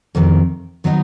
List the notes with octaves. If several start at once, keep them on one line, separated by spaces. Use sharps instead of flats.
F2 C3 D#3
D#3 F#3 B3 D#4